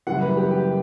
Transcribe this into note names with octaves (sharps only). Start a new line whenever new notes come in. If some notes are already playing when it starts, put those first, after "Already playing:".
F#1 F#2 E3 G3 F#5
B4
G4
G4